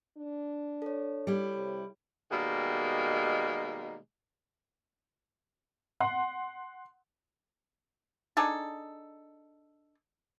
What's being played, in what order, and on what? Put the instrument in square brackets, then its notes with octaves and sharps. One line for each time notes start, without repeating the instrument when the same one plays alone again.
[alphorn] D4
[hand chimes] A4 C#5
[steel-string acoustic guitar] G3 E4
[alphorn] C3
[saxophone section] B2 D#3 G3 G#3 A#3
[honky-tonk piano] F#5 C6
[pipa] D4 D#4 G#4 A4